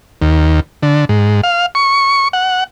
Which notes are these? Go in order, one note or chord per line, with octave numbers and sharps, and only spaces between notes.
D#2
D3
G#2
F5
C#6
F#5